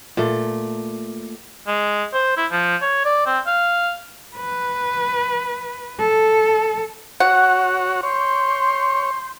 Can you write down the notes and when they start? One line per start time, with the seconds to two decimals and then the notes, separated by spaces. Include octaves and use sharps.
0.17 A#2 A3
1.67 G#3
2.14 C5
2.37 E4
2.52 F3
2.82 C#5
3.05 D5
3.26 C4
3.47 F5
4.36 B4
5.99 A4
7.20 F#4 C#5 F#5
8.03 C#5 C6 G6